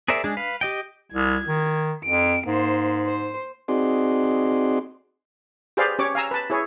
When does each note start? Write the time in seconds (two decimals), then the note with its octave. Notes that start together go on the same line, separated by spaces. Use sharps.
0.08 G#4 A#4 C5 D5 E5
0.24 G#3 D4 G#4
0.37 B4 F5
0.61 G4 D#5 G5
1.14 C2 G#6
1.47 D#3
2.05 F2 D7
2.47 G#2 A#3 C5
3.06 C5
3.68 C4 D#4 F#4 G#4 D5 C6
5.77 G4 G#4 B4 C5 D5 F5
5.99 C#4 G4 C#5 D6
6.15 F5 G#5 A#5 E6
6.31 B4 A5
6.50 E4 G#4 C#5